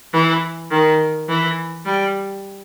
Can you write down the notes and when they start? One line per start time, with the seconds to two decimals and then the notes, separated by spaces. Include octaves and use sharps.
0.13 E3
0.71 D#3
1.29 E3
1.86 G3